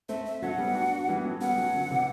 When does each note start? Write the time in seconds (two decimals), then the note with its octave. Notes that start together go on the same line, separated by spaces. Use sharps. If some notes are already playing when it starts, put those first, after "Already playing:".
0.09 A3 C4 E5
0.25 E5
0.42 F#3 A3 F#5
0.58 G3 B3
0.75 D4 F#4
0.92 D4 F#4
1.08 E3 G3
1.17 B3
1.24 F#3 A3
1.41 G3 B3 F#5
1.58 F#3 A3
1.74 D3 F#3
1.91 C3 E3